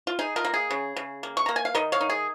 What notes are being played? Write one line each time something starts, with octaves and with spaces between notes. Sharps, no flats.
F4
D#4 G#4
F4 A#4
A#3
G#4
C#3
C#3
A#3
C#6
A#3 A#5
G#5
F5
D#3 A#4 D#5
C#5 F5
D#4
G#4